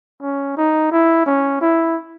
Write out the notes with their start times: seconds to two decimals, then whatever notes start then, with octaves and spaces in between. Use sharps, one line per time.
0.22 C#4
0.57 D#4
0.92 E4
1.26 C#4
1.61 E4